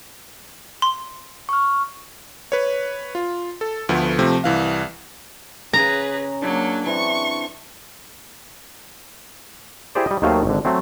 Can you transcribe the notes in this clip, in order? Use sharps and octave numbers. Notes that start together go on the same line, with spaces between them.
C6
C#6 F6
B4 C#5
F4
A4
D2 F3 A3 B3
C3 F3 A3 C4
C2 E3 F5
C#3 G#4 B4 A#5
F#3 A#3 D4
E3 C4 D4 C#6
E4 G4 G#4 C5 D5
G3 D#5
D#2 D#3 F#3 A3 C5 F5
G#1 D3
F#3 A3 C4